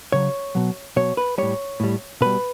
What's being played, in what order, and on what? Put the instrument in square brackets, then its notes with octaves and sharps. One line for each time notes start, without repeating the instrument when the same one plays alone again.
[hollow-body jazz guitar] C#3 F#3 C#5
B2 F#3
B2 F#3 C#5
B4
A2 G3 C#5
A2 G3
B2 G3 B4